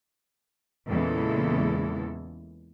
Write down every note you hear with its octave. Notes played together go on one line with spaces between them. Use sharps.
E2 A#2 C#3 E3 G#3 A4